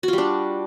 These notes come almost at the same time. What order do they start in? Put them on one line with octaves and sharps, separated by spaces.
F#4 F4 G3 D4